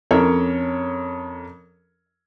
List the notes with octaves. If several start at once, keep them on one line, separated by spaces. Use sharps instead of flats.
F2 C#4 A4 A#4 C#5